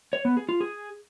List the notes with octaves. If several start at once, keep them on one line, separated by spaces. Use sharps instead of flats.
C#5
B3
G#4
F4
G#4